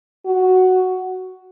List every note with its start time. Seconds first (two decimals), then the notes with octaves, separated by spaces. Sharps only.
0.26 F#4